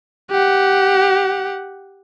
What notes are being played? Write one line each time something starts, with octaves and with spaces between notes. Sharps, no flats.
G4 F#5